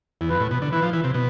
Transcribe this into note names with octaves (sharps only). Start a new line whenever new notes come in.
E2
F2 B4
A2
B2
D3
E3 B4
F3
E3
C3
B2